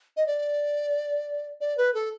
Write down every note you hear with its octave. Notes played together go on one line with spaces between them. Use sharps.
D#5
D5
D5
B4
A4